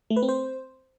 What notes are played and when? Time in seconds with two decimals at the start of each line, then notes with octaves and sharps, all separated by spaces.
0.10 A3
0.16 B4
0.23 C4
0.29 C5